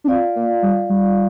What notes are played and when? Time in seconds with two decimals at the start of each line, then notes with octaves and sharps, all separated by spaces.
0.04 D4
0.08 C4 F4 D5 F5
0.36 A#3
0.63 G3
0.89 G3